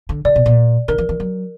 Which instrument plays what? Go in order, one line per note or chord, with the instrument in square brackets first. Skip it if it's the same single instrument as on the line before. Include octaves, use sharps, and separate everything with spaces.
[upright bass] D3
[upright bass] C#3 [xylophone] D5
[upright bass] B2
A#2
[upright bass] D3 [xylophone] A#4
[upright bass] E3
E3
F#3